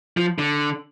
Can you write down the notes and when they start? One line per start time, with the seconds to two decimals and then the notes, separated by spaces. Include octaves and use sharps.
0.17 F3
0.38 D3